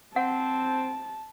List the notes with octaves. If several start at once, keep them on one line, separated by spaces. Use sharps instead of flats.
C4 F#5 A5